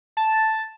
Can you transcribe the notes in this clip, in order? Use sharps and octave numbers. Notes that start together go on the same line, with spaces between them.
A5